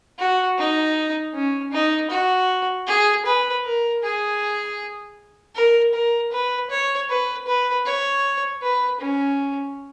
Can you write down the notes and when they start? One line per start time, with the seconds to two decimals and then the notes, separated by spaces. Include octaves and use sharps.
0.19 F#4
0.58 D#4
1.34 C#4
1.72 D#4
2.10 F#4
2.87 G#4
3.25 B4
3.64 A#4
4.03 G#4
5.55 A#4
5.94 A#4
6.32 B4
6.70 C#5
7.09 B4
7.46 B4
7.86 C#5
8.62 B4
9.00 C#4